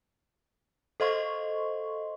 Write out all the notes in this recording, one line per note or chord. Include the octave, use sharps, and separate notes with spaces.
A4 C5 D#5 F5 C6 C#6